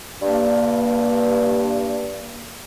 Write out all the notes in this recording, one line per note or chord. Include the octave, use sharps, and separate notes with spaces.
G2 A#3